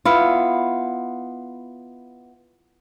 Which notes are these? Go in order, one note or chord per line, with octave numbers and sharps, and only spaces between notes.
B3 E4 F4